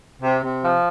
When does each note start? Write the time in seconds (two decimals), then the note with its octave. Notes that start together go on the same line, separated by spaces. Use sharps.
0.22 C3
0.42 C3
0.63 F3